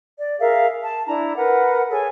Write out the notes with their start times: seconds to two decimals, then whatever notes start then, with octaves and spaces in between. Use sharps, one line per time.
0.20 D5
0.39 G#4 A#4 E5 F5
0.82 A5
1.07 D4 E4 A#5
1.36 A#4 B4 F#5
1.91 G#4 A4 C#5 G#5